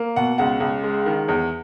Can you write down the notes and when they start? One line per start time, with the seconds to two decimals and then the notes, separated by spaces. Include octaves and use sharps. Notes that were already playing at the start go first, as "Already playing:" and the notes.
Already playing: A#3
0.16 B2 F#5
0.38 C#2 F#5
0.60 C#2
0.84 G#3
1.06 D#3
1.28 E2